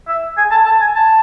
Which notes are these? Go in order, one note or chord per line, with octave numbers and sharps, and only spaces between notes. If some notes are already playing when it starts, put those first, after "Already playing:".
E5
G#5
A5
A5
G#5
A5